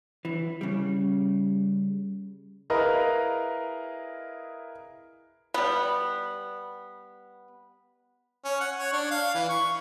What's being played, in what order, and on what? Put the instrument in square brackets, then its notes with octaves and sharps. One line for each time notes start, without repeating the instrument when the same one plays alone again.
[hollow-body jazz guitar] E3
C#3 G3
[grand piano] E4 G#4 A#4 B4 D#5 F5
[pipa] G3 B3
[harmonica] C#4
F#5
C#5
D4
F5
E3
C#6